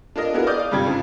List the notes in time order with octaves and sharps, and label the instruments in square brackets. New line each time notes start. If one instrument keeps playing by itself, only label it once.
[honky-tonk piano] D4 F4 A#4 D#5
B3 E4 F#4 G#4 A#4
D5 D#5 D6 D#6 F6 G6
F5
G2 C3 G3 F4 G#6
G#2 C#3 F3